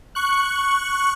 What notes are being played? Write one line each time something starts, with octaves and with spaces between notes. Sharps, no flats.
C#6 F#6